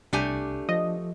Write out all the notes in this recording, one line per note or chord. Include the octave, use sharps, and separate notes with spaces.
C2 A3 D4 G4 G#5
F3 D#5